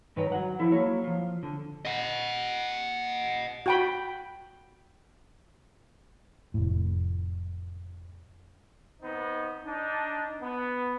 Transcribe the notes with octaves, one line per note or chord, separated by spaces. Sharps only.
G2 D#3 B4 C#5 G5 A#5
F#3 F#5
F3 E4 A4
F#3 A#3 C#5
F3 F4
D3
D#5 F#5
F#4 G5 B5
F1 A2
D#3 B3 C4 D#4
D4 D#4
B3